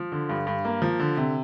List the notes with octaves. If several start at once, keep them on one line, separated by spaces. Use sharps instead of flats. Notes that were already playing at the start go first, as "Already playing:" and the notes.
Already playing: F3
D3
G2
G2
A#3
F3
D3
C3